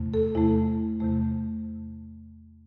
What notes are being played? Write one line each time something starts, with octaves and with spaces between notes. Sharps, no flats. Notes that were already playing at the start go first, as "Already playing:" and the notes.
Already playing: E2 C3 A3
A4
E2 C3 A3 E4
E2 C3 A3